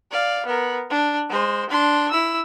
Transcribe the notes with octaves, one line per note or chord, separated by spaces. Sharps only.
D5 F5
B3 A#4
D4
G#3 C5
D4 C6
E4 E6